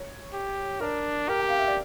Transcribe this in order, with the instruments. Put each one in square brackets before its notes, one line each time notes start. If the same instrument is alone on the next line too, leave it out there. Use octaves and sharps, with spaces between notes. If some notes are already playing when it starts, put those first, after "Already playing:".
Already playing: [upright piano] C#5
[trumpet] G4
[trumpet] D4 [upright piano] A#4
[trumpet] G4 [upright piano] A#4
[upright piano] G5
F5
E5
D5